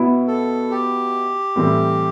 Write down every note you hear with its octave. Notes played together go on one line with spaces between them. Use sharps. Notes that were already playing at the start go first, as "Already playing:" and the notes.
Already playing: B2 B3 E4
A4
G4
A2 E3 G3 C4